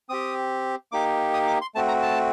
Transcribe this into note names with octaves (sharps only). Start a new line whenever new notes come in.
C4 G4 D#6
A#3 D#4 G4 D6
D#6
D6
C6
A3 C4 F#4 A5
A#5
A5